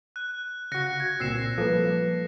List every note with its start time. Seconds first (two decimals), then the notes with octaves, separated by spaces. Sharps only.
0.16 F#6
0.72 C#3 F#4 F#6 A#6 C#7
1.00 G#6 A#6
1.20 C2 A#2 C4 E6 A#6 C7 E7
1.58 F3 G3 A#3 A4 B4